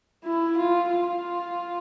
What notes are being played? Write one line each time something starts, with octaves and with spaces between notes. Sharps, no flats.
E4
F4
F4